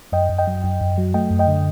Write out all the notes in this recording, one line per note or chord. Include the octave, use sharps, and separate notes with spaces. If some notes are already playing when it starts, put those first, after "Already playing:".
F#2 D#5 G5
F#2
D#5 G5
F#3
F#2
F#2
F#3
A3 D#5 G5
F#2
D#5 G5
D3